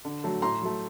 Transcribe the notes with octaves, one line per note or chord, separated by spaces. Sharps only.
D3
F#3 A3
A2 A#5 C6
F#3 A3